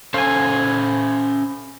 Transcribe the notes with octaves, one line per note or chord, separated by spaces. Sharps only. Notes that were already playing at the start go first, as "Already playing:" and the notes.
C#4 A4 C5 F5 G#5